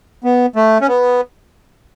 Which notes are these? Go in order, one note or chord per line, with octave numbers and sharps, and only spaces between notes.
B3
A3
C#4
B3